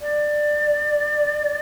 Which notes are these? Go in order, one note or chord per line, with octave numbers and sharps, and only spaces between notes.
D5